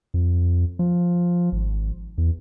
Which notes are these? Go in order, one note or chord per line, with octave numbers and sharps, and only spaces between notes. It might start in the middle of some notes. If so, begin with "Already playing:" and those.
F2
F3
G#1
E2